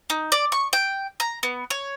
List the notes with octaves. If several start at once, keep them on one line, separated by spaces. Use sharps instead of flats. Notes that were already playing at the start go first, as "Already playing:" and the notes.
D#4
D5
C#6
G5
A#5
B3
C#5